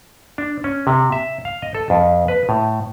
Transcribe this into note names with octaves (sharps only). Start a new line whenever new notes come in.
D4
C#4
C3
E5
F5
D#5
A4
F2
B4
A2